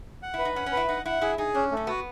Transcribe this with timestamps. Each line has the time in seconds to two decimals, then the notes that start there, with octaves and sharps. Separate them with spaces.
0.23 F#5
0.34 E4
0.39 B4
0.45 D#4
0.56 C#4 F#5
0.66 C#4
0.72 E4 B4
0.88 D#4 F#5
1.06 E4 F#5
1.21 E4 G#4
1.38 D#4 G#4
1.55 C#4 D4
1.72 A3
1.77 C#4
1.87 B3 F#4